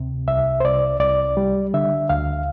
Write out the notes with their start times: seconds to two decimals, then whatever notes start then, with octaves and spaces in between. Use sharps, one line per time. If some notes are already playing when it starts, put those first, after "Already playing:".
Already playing: D2 C3
0.28 C2 E5
0.60 C5
0.64 C2 D5
1.00 C2 D5
1.37 G3
1.74 D3 E5
2.09 D2 F5